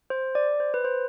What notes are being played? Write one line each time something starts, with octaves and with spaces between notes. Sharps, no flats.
C5
D5
C5
B4
C5